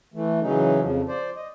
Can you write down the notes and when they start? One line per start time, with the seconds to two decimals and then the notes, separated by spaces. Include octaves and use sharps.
0.14 E3 A3
0.42 C#3 E3 F#3 C#4 D#4
0.81 F2 C#3 F3
1.08 C5 D5
1.36 D#5